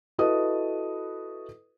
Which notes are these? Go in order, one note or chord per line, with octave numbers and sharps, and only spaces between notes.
E4 F#4 A4 B4 D#5 D#6